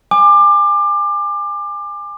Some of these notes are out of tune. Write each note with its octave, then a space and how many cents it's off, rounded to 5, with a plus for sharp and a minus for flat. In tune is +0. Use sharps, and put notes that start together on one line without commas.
G#5 -15 D6 +25